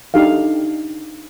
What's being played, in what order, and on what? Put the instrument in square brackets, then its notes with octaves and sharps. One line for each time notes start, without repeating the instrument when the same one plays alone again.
[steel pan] D4 D#4 G4 A4 F5